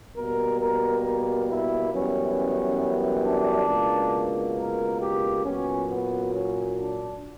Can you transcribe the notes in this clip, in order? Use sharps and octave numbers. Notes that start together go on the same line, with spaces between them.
B2 G3 A#3 A#4
A#4
A#4
E4
F#2 E3 G3 B3 C#4
D4
C#2 B2 A#3
A#4
G4
A#2 F#3 B3 C#4
B3
C#4
D4